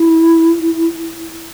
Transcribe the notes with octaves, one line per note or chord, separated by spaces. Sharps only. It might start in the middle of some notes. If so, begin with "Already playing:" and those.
Already playing: E4